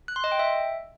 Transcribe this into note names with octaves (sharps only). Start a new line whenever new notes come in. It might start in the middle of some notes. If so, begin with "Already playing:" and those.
F#6
C6
D#5
G5
E5